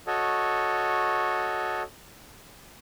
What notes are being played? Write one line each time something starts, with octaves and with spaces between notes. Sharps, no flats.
F#4 A4 C#5 D#5